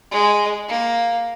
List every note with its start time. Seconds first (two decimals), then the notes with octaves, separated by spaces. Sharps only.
0.11 G#3
0.69 A#3